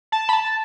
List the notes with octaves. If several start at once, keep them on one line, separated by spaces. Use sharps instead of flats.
A5
B5
A5